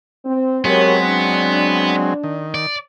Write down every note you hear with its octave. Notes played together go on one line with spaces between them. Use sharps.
C4
F#3 G#3 B3 C4 G4 A#4 C#5
D4
D#3
D5